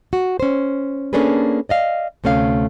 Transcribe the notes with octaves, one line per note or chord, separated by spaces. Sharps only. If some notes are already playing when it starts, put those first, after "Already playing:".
F#4
C#4 C5
A#3 C#4 D4 G#4 A4 B4
D5 D#5 F5
D2 C3 A3 C#4 G4 F5